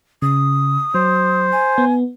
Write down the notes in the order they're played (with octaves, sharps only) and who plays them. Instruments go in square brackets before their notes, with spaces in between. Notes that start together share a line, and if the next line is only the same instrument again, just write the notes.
[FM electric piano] C#3 [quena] D#6
[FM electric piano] F#3 [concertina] C5
[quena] G#5
[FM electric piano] B3